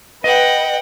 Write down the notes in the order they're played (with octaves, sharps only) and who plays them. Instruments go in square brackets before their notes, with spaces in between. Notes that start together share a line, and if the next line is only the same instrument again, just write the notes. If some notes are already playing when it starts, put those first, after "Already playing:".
[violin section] B4 [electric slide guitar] D#5 [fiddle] F#5 G5